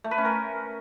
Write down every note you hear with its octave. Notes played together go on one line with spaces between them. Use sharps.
A3
B4
C#4
A#4